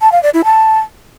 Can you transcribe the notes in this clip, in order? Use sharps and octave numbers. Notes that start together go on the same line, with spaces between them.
A5
F5
D5
E4
A5